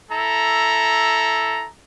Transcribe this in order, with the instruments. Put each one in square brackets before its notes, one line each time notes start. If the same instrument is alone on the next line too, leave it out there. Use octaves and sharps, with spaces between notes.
[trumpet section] E4 A4 A#5